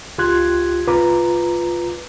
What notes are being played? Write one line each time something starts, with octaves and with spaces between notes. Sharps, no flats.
C#2 F4 G4 C6 F#6 G#6
C2 F4 B4 A#5 D6